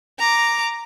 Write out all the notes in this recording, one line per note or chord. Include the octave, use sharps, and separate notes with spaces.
A#5 D6